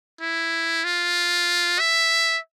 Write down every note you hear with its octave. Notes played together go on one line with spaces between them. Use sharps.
E4
F4
E5